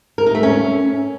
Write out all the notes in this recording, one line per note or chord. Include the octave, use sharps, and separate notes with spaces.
A#4
D#4
A3
C#4